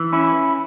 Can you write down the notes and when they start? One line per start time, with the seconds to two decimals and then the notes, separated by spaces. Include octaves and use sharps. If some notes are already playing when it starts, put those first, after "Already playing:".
Already playing: E3
0.13 C#4 E4